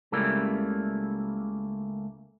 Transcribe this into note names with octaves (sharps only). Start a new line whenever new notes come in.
C#2 C#3 G3 A3 A#3 E4